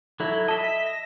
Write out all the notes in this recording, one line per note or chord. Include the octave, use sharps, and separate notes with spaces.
F#3 E4 A4
D#5 E5 A5
B6
A#6